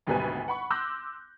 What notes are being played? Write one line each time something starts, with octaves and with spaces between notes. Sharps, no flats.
G#1 D2 B2 G3 B4 G#5
F#5 B5 C#6
C6 D6 E6 F#6 G6 A#6